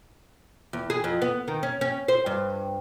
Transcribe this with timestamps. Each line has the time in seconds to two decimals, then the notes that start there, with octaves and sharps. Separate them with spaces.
0.73 E2
0.90 G#4
1.04 F2
1.22 B3
1.48 D#3
1.63 C#4
1.81 C#4
2.08 C5
2.26 G2